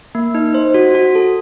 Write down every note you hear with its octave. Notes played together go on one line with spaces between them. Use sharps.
A#3
D#4
C5
F#4
F#4
A4